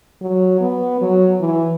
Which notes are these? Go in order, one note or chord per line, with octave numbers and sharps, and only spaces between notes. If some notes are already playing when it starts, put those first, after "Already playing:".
F#3
B3
F#3
E3